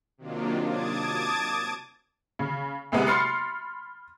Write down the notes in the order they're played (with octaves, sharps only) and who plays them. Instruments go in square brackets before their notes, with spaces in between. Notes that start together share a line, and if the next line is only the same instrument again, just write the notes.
[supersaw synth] C3 D#3 F#3 A#3 D4 F4
A5 D6 D#6 G#6 A6
[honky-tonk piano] C#3
C2 C3 G#3 B3
B5 C6 F6 A6 C7 C#7